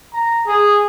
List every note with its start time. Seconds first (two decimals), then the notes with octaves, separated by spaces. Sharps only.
0.14 A#5
0.46 G#4